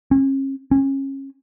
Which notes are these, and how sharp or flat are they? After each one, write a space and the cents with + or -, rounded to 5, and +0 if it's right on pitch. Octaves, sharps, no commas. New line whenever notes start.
C#4 -40
C#4 -30